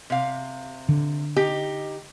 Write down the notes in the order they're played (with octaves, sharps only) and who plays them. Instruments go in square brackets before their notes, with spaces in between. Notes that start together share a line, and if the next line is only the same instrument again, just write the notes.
[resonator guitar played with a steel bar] C3 F5
[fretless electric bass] D3
[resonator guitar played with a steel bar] D#4 G4